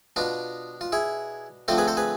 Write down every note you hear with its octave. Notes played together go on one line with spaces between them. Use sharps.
B2 B3 D4 F4
F4
E4 G#4
D3 F3 A3 C4 F4 A4
G#4 B4
A4 C5
G#4 B4